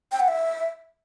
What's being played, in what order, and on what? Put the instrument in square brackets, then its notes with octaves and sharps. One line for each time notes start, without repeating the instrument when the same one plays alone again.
[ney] G5
F#5
E5